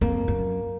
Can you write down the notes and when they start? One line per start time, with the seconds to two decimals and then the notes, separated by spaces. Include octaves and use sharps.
0.01 F2 A#3
0.28 F#2